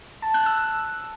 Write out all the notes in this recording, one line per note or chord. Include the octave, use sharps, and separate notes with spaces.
A5
F#6
E6